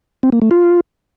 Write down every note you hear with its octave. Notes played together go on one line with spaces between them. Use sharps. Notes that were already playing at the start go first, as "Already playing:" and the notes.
C4
A#3
A3
F4